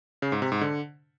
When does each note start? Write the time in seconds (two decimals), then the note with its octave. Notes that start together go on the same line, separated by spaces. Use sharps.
0.22 C#3
0.32 G#2
0.42 C3
0.52 G#2
0.61 D3